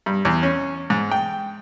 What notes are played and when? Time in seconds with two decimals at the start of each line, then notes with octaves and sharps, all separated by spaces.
0.06 G2
0.25 E2
0.43 C#4
0.90 G#2
1.11 G5